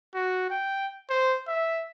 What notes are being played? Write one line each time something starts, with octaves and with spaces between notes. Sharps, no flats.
F#4
G5
C5
E5